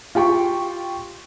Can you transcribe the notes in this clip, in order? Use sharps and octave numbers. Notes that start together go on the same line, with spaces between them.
F4 G4 G5 C#6